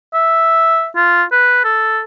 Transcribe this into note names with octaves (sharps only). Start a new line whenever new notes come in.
E5
F4
B4
A4